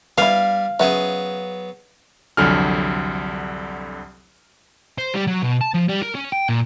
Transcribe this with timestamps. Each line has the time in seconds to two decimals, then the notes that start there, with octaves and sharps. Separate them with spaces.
0.18 G3 B3 E4 F5 G#5
0.80 C#3 F#3 B3 G#4 C#5 E5
2.37 C2 F2 D3 F#3 G#5 F6
4.98 C5
5.14 G3
5.28 F#3
5.42 B2
5.61 A5
5.74 F3
5.89 G3
6.03 A#4
6.15 C#4
6.32 G5
6.49 A#2